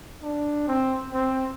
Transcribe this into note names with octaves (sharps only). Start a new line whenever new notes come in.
D4
C4
C4